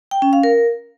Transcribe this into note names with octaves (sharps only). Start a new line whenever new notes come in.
G5
C#4
F5
A#4